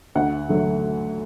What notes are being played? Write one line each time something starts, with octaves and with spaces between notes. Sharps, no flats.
D2 F#5
D3 F#3 A3